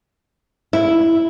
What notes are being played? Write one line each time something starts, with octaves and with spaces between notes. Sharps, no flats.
E4